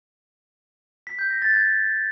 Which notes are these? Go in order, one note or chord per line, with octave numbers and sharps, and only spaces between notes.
B6
G6
A#6
A6
G#6